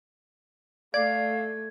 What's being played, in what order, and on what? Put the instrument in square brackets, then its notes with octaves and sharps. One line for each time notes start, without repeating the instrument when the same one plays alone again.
[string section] A3 [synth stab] D5 [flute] F5 [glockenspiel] G#6